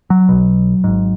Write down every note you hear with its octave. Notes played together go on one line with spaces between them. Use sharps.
F#3
B1 B2
G#1 G#2